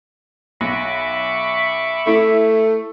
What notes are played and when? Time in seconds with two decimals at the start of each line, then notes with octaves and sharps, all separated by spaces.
0.61 B1 E5 B5 C#6 D6
2.07 A3 E4